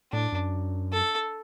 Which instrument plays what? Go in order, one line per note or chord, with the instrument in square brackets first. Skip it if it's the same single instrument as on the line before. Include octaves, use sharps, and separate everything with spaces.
[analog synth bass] A2 [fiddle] D4
[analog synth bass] F#2
[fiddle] A4